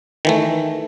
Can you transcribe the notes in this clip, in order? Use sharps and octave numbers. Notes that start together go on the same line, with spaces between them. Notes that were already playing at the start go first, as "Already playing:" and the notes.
D#3 E3 A3